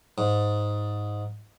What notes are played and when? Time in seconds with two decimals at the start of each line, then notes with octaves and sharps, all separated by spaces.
0.18 G#2